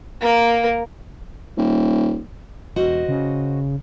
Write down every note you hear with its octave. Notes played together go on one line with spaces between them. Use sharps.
A#3 A#4
D#1
E1 F#4 C5 D#5
C#3